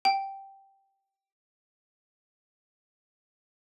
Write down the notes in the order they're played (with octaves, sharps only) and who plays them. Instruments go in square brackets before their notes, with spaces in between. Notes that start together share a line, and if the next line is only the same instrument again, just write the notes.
[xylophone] G5